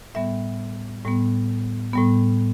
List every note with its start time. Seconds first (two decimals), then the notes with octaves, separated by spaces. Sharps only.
0.15 A2 G3 B3 E5
1.04 A2 G3 B3
1.93 A2 G3 B3